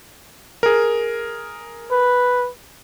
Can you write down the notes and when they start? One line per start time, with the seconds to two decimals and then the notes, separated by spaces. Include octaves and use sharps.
0.63 G#4 A#4
1.91 B4